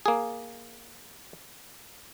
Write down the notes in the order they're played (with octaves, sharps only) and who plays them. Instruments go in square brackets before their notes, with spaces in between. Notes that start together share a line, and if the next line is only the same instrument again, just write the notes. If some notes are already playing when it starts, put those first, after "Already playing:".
[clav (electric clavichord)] A#3 G#4